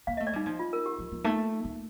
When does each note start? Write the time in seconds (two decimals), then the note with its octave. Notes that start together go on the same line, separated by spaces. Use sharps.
0.07 A#3 F5
0.17 D#5
0.20 A3
0.27 D5
0.33 G3 D#4
0.46 F3 D#4
0.59 F4
0.73 A#4
0.86 G4
0.99 F3
1.12 F3
1.24 A3 D#4
1.64 A3